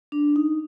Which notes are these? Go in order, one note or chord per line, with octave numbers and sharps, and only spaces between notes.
D4
D#4